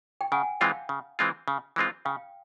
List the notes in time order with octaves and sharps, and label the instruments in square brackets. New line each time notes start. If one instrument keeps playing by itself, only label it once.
[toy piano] G5
[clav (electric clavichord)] C#3 [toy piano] F#5 G#5
[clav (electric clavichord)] E3 G#3 C4 F4 [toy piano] F5 G5
[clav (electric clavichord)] C#3
E3 G#3 C4 F4
C#3
E3 G#3 C4 F4
[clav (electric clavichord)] C#3 [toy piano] F5 G5